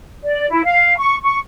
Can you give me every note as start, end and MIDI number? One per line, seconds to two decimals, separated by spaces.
0.24 0.47 74
0.49 0.60 64
0.63 0.93 77
0.98 1.16 85
1.22 1.37 85